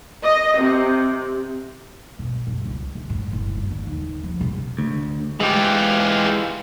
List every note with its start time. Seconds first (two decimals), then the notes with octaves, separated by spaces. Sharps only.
0.24 D#5
0.59 C3
2.19 B2
2.47 F#2
2.66 C#2
2.95 D1
3.10 A2
3.33 F#1
3.57 G1
3.71 D3
3.87 D#2
4.23 F3
4.41 C3
4.78 D2
5.40 E3 G#3 F4 G4